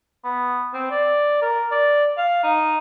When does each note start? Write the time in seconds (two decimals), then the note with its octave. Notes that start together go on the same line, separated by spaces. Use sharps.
0.25 B3
0.74 C4
0.91 D5
1.42 A#4
1.71 D5
2.18 F5
2.44 D#4